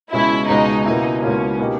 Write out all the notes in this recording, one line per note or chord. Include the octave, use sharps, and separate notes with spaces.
C#2 B2 G#3 C#4 E4
C#2 B2 G#3 C#4 D#4
C#2 B2 A#3 D#4 E4
C#2 B2 A#3 C#4 E4
B2 A#3 D#4 G4